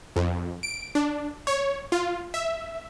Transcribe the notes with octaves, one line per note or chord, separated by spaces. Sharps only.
F2
D7
D4
C#5
F4
E5